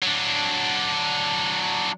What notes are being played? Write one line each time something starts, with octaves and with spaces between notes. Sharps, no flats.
F#3 D4